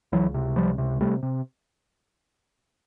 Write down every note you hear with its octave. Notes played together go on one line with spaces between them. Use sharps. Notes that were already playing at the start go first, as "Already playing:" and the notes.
C#2 E3 F#3
C3
C#2 F3 G3
C3
C3 G3 A3
C3